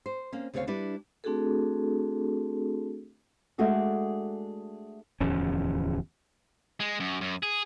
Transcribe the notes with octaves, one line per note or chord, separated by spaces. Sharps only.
C5
A#3 C4 C#4
D2 C#3 C4 C#4 C#5 F5
G3 D4 E4 B4
A3 C4 D4 F#4 G#4 A4
G#3 A3 D4 F#4 G#4 A4
D1 E2 F3 C#4
G#3
F#2
F#2
G#4